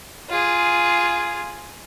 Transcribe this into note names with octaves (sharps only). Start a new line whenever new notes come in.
F4 G#4